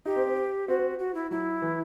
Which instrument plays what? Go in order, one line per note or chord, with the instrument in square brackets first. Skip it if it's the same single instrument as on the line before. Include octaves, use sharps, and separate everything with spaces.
[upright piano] D#4 [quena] G4
[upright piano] C4
C4
[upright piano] C4 [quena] F#4
[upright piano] C4
[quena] F#4
E4
[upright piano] F#3 [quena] E4
[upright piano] E3